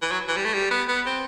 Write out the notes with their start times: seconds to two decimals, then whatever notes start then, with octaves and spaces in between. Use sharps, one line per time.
0.01 E3
0.11 F#3
0.28 E3
0.36 G3
0.45 A3
0.54 G3
0.70 B3
0.88 B3
1.06 C4